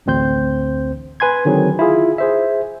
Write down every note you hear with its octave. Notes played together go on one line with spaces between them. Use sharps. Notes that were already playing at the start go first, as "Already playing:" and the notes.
A1 D2 C4 C5 G6
B4 G#5 C6 G#6
D3 D#3 F#3 C4 G#4
E4 F4 G#4
G#4 C5 E5